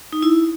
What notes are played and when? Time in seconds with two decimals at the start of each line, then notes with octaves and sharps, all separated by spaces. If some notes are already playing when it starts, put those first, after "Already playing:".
0.13 D#4
0.22 E4